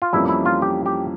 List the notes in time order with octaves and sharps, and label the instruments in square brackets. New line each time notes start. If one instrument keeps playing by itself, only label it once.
[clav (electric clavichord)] F4
[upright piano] F2 E3 G3 A#3 C#4 [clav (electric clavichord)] E4
[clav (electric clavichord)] E4
F4
G4
G4